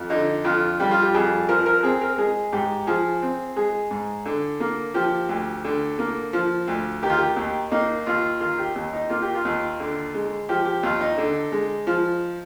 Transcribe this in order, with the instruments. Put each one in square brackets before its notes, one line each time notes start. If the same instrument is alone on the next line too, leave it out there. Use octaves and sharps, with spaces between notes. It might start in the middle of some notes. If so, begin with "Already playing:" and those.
Already playing: [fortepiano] F2
D3 D#4
F2 F4
G3 G4
F4
G4
F2 G#4
F3 A#4
A#4
C4 G#4
A#4
G#3 G#4
G#2 G4
F3 G#4
C4
G#3 G#4
G#2
D3
A#3
F3 G4
D2
D3
A#3
F3
D2
D#3 G4
F4
G4
D#2
A#3 D#4
D#2 F4
D#3 F4
G4
D#2
D#4
A#3 F4
G4
F4
D#2
D3
G#3
F3 G4
G4
D#2 F4
D#4
D3
G#3
F3